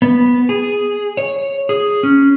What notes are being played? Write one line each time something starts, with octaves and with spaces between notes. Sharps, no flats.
B3
G#4
C#5
G#4
C#4